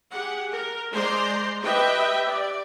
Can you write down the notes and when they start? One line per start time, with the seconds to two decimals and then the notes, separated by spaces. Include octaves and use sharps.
0.12 G4 G#4 F#5
0.53 A#4
0.93 G#3 C5 D5 A#5 C6
1.61 G4 B4 D#5 E5 G5
2.27 D5